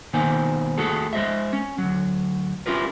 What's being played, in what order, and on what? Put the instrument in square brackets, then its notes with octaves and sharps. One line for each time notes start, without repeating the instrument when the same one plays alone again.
[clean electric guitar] B2 D#3 A#3 D#4 C5 G#5
D#2 A3 F#4 G#4 A4
G#3 C5 D#5 E5
C#4
D2 F#3
C#4 E4 F4 G4 A#4 B4